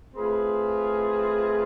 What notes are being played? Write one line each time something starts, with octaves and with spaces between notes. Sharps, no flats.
A3 C4 F4 G#4 B4